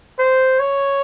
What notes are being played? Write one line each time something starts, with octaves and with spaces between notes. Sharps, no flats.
C5
C#5